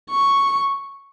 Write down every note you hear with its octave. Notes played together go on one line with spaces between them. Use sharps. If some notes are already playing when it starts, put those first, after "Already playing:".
C#6